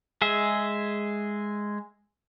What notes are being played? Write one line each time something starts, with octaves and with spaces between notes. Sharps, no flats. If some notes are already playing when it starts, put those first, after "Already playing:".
G#3 G#4 E5